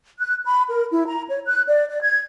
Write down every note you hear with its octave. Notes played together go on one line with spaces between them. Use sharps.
F#6
B5
A#4
E4
A#5
C#5
F#6
D5
D5
G#6